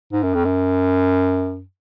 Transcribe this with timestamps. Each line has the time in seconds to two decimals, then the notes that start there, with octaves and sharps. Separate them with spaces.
0.12 G#2
0.23 F#2
0.34 F2
0.45 F#2